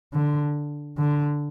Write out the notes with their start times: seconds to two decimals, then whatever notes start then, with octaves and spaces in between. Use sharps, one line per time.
0.14 D3
0.98 D3